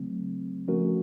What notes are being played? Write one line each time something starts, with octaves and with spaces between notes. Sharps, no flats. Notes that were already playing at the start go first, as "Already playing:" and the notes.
Already playing: C#3 F#3 A3 C4
F3 A3 C#4 F#4 A#4